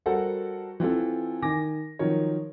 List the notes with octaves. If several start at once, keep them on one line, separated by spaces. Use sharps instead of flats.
G3 F#4 A4 A#4 C5 F#5
E3 C4 F4 A4
D#3 G#5 D6 A#6
D#3 F3 F#3 A#4 C#5